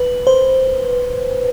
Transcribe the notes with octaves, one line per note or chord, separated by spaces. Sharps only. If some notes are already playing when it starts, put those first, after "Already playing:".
Already playing: B4
C5